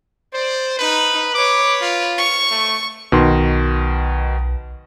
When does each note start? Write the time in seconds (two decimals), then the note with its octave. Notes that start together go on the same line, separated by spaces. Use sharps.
0.34 C5 D5
0.79 D#4 B4
1.35 B4 C#5 D6
1.82 F4
2.18 C#6
2.50 A3
3.12 B1 B2 D#3 C6